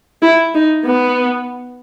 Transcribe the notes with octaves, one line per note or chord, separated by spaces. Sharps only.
E4
D#4
B3